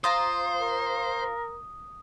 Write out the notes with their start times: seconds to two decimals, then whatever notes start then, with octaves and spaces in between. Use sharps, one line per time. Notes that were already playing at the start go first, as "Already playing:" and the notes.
0.04 F4 C5 A#5 D#6
0.60 A#4